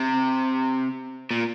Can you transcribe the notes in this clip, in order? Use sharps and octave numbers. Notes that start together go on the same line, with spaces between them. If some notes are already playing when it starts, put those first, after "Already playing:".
Already playing: C3
A#2